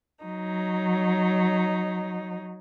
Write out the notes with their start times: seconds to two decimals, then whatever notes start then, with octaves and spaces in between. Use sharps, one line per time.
0.24 F#3 D#4